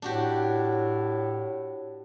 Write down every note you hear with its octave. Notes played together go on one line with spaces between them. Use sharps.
A2 D4 F#4 G4